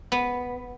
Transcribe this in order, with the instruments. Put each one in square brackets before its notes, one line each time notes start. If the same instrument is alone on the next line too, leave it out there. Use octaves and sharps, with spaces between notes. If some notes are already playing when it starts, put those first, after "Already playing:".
[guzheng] B3